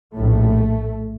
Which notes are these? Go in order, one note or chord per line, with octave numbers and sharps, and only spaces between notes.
A#1 A2 A3